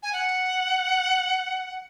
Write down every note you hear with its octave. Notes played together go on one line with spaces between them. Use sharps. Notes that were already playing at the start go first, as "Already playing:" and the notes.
G#5
F#5